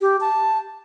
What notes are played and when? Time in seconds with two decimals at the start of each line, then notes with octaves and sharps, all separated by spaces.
0.01 G4
0.20 A5